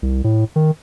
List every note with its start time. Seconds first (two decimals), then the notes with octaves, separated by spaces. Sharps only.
0.02 C2
0.24 A2
0.56 D#3